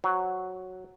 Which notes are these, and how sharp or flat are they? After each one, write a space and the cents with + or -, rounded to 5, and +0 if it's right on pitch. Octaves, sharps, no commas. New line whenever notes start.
F#3 +0 C5 +0